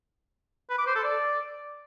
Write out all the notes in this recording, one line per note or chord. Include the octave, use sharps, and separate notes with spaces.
B4
D6
C5
A4
D5